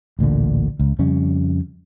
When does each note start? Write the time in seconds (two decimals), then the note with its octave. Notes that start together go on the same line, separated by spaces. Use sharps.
0.19 A1 D2 A#2 D3
0.80 C#2
0.99 F2 C#3 G3 C#4